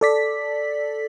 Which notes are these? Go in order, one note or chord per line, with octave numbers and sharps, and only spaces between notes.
A4 D5 B6